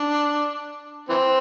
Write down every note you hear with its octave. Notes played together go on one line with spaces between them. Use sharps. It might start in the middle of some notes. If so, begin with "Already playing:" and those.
Already playing: D4
E3 C4